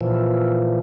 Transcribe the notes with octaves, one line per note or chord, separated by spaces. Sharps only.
A#2 E3 F3